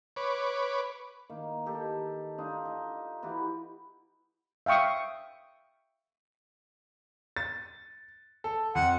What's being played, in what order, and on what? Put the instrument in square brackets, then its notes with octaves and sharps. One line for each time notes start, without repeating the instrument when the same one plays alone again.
[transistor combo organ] B4 C#5 D6
[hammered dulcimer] D#3 A#3
D#3 G4 A4 A#5
D4 D#4 F4
D#4
E3 E4 F#4 G4
[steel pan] E5 F5 G5 C#6 D#6
[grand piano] A6
A4
[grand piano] F2 [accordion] F#5